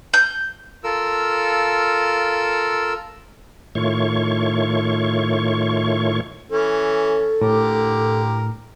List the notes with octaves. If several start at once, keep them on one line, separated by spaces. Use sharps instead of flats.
G6
F4 A4 A#4 E6
A2 D#3 A3 F4 C#5 C#6
E3 C#4 A4
A2 D3 G4 A#4